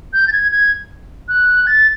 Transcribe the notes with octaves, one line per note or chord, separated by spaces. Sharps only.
G6
A6
G#6
G#6
F#6
A6